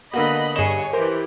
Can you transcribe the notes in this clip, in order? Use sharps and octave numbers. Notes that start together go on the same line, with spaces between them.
D3 A#3 B3 F#4 D#5 B5
G2 G#4 C#5 D#5 E7
E3 G4 A#4 C5